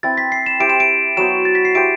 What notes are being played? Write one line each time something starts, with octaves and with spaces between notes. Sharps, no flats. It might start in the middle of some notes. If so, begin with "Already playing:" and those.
C4 E4 B4 A6
B6
C7
E7
E4 G4 C5 D7
E7
D7
F#3 B3 F#4 C5 E7
A6
B6
C7
E4 G4 C5 D7